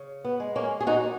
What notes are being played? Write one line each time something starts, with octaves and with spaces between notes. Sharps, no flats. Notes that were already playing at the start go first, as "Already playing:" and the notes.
Already playing: C#3
B3
G#3
A#3 C#4
G#4
A#2 D#4 F#4